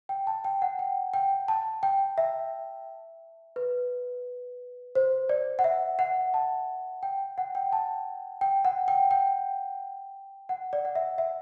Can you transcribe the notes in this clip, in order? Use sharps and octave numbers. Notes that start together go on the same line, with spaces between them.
G5
A5
G5
F#5
G5
G5
A5
G5
E5
B4
C5
D5
F#5
E5
F#5
A5
G5
F#5
G5
A5
G5
F#5
G5
G5
F#5
D5
F#5
E5
E5